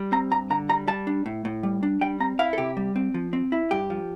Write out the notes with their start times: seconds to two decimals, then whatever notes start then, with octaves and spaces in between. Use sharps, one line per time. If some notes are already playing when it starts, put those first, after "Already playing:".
Already playing: G3
0.12 C4 A#5
0.31 G2 A#5
0.50 D3 A#5
0.69 G3 A#5
0.88 G3 A5
1.07 D4
1.26 A2
1.45 A2
1.63 G3
1.83 D4
2.01 G3 G5
2.20 C4 A#5
2.39 E4 F5
2.53 A4
2.58 C3 G4
2.77 G3
2.96 C4
3.14 F3
3.33 C4
3.52 E4
3.71 G2 G4
3.90 F3